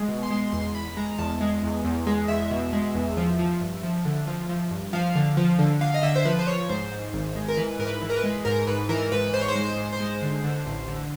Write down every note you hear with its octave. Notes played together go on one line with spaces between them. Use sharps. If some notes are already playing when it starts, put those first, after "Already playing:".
Already playing: G#3
B2
C6
G#3
E2 C6
E2 B5
G#3 A#5
E2 A5
G#3
E2
E2
G#3
E2 E5
B2
G#3
E2
F3
F3
G2
F3
D3
F3
F3
G2
F3 F5
D3
F3
D3
D3 F5
D#5
D3 E5
C5
F3 B4
C5
F3 C#5
G#2 C5
G#2
G#1
G#3
A#4
E3 B4
G#2 A#4
B4
E3
A#4
B4
G#3
G#2 A#4
G#2 B4
E3 A#4
G#2 B4
G#2 C5
C#5
C5
G#3
C5
G#2
C5
G#3
D3
D3
A1
D3